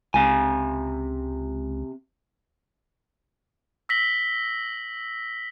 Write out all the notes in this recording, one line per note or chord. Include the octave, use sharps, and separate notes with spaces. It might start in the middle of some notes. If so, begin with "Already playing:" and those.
C#2 C3 G#5
E6 A#6 B6 F#7 G7